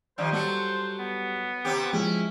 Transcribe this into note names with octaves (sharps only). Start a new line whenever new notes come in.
D#3 F3 G3 C5
F#3 G3 F#4 A4
B3
C3 C4 G4
F3 G#3 C#4 E4